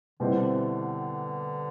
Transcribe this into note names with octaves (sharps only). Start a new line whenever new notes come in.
B2 D3 G3 C4 E4